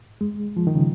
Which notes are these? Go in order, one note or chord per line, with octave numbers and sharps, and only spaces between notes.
G#3
F3
D#3
C#3